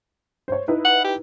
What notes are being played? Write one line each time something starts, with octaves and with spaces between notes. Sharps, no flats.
C5 C#5
D#4 E4 B4
F#5
G4